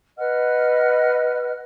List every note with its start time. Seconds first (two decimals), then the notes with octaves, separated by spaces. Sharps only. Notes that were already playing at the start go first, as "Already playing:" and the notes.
0.18 B4 D#5 F#5 F6